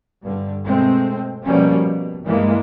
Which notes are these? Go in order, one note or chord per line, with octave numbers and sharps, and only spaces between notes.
G2 D3
B2 G#3 A3 C4
B2 F3 G3 A#3 C#4
B2
G2 E3 G#3 A#3